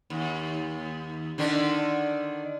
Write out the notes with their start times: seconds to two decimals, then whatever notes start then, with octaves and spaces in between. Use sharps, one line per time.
0.10 D#2
1.38 D3 D#3 D4